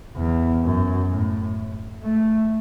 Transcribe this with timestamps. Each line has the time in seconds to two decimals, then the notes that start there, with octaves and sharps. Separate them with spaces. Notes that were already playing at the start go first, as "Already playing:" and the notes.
0.16 E2
0.63 F#2
1.10 A2
2.03 A3